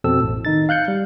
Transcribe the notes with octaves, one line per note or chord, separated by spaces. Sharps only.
F2 B2 C4 A4 E6
A1 A2
D#3 D#4 A6
F5 F#6 G6 C#7
G3